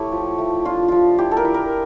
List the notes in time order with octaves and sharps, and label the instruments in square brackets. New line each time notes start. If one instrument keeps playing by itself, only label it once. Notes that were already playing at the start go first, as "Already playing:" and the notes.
Already playing: [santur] A3 E4 G4 C#5
F3
A3
D4 F4
F3 F4
E4 G4
A4
A#4
E4
A#4